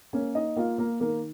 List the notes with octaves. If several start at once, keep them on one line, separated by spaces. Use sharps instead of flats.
A#3 C#4 C#5
D#4 D#5
A#3 F4 F5
A#3 A#4
D#3 A#3 A#4